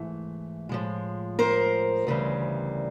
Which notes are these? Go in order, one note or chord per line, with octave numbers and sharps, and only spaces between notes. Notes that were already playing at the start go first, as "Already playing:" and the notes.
Already playing: G#2 E3 A3
A2 F3 G#3
A#4 C5
D2 C#3 E3 G3